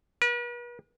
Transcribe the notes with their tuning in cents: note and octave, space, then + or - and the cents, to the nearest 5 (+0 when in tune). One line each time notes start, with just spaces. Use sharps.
B4 -45